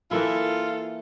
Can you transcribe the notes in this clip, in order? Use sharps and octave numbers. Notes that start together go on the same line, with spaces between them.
E3 A#3 E4 F4 A4